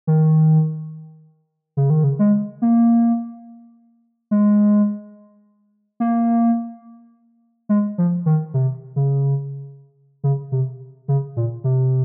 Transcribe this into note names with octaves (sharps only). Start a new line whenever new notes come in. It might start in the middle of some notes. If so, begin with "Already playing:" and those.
D#3
C#3
D#3
C#3
G#3
A#3
G#3
A#3
G#3
F3
D#3
C3
C#3
C#3
C3
C#3
A#2
C3